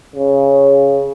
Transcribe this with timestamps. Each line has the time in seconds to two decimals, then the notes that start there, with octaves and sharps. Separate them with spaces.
0.15 C#3